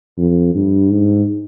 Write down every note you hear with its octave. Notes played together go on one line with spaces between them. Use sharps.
F2
G2
G#2